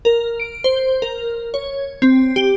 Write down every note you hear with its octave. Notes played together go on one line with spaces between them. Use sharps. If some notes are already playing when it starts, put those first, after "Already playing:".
A#4
D7
C5
A#4
C#5
C4
G4